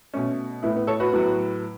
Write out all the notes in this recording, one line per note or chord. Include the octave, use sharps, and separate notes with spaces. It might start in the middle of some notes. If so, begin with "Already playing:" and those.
B2 A3 C#4
A2 A3 B3 E4
B3
A4 C#5
F#4 B4
A2 F#3 B3